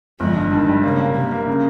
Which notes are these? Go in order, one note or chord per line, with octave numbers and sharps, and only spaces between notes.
G1 F3 G#3
G2
G2 D#3
G3
C#3 A#3
A#3
C3 A#3
A#3
C#3